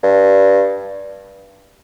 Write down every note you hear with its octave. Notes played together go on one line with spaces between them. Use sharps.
G2